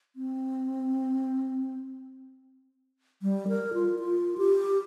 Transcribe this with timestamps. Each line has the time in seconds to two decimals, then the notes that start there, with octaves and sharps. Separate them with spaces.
0.16 C4
3.22 G3
3.48 A#4
3.74 F4
3.99 F4
4.38 G4